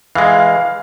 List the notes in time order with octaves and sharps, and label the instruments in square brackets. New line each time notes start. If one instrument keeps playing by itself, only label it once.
[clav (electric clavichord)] E3 G#3 [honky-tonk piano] F5